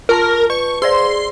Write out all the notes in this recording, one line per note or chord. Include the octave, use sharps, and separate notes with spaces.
F4 A#4 A5
B4 C#6
G#4 C5 D5 C6